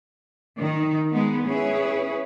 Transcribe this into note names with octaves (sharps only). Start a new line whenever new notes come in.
D#3 D#4
G#3 B3 D#4
C#4 E4 G#4 B4 C#5